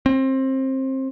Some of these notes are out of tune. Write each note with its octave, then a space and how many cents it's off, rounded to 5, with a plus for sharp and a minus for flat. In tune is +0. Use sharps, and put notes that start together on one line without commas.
C4 +25